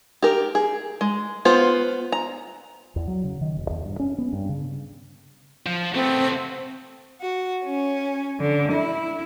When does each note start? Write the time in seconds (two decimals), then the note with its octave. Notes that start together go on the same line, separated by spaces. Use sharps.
0.22 G4 A#4
0.55 G#4
1.01 G#3
1.45 B3 F4 C5
2.12 A#5
2.96 E2
3.08 F#3
3.24 C#3
3.41 D#3
3.57 E1
3.70 E2
3.85 G2
3.99 C#4
4.18 B3
4.33 G2
4.49 C#3
5.66 F3
5.95 A3 B3 C4
7.19 F#4
7.64 C#4
8.40 D3
8.72 E4